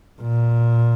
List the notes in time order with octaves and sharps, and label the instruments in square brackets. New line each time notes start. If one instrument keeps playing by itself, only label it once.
[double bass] A#2